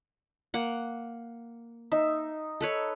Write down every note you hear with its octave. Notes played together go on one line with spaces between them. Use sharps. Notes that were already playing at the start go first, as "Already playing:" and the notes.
A#3 F#5
D#4 E5
A4 B4 C#5